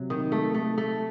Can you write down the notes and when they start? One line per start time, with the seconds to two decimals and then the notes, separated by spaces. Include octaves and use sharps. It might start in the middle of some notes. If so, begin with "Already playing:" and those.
Already playing: C3 F#3
0.10 D#3
0.32 A3
0.54 A3
0.78 A3